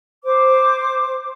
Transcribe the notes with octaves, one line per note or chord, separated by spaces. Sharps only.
C5 D6